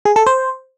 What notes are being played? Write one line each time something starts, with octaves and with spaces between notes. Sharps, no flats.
G#4
A4
C5